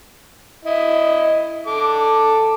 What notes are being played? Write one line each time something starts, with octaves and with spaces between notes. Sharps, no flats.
E4 D#5
A4 D6